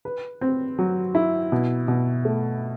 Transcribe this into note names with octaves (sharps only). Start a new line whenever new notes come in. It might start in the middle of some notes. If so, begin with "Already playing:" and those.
B4
C4
F#3
E4
B2
B2
A3